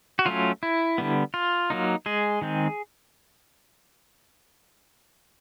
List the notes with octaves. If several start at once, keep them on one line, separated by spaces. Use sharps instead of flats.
F#4
F#3 A3 C#4 F4
E4
D3 G3 B3
F4
F#3 A#3 D#4
G#3 G#4
D#3 G#3 C4